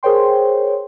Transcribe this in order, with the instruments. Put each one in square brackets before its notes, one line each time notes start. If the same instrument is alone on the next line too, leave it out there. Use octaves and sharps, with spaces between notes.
[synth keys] G#4 A#4 C5 C#5 G5 C6